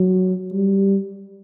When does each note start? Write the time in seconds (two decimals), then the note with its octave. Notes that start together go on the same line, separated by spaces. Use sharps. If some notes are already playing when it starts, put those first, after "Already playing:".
Already playing: F#3
0.52 G3